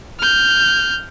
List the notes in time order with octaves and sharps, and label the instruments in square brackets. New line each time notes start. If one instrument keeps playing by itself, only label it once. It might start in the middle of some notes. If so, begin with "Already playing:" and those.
[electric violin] F6 G6